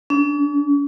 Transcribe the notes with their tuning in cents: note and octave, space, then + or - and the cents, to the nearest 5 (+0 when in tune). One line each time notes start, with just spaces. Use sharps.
C#4 +45